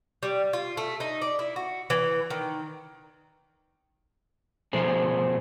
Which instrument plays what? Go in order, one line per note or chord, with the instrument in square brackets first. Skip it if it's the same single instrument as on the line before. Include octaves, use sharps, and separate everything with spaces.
[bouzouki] G3
F4
A3
D#4
D5
E4
F#4
E3
D#3
[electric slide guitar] B2 F3 A3 G#4 C5